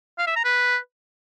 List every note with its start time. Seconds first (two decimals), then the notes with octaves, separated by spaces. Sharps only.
0.18 F5
0.27 E5
0.36 A#5
0.44 B4